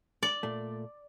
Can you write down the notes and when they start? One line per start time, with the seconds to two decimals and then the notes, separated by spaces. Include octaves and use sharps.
0.23 D5
0.43 A#2 A3